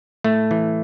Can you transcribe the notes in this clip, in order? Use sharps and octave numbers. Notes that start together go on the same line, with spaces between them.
A2 A3
E3